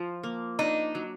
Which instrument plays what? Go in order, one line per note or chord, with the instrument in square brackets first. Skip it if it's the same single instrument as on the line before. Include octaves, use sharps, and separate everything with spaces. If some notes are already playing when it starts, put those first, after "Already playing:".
Already playing: [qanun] F3
A#3
[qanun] D4 [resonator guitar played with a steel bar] D#4
[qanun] F#3